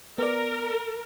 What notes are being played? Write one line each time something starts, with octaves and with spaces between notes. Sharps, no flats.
B3 A#4 D5